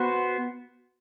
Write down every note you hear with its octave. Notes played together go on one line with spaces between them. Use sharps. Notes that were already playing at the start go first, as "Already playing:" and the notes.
Already playing: B3 F#4 C5